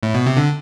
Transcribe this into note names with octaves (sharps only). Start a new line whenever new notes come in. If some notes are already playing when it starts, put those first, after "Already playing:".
A2
B2
C3
D3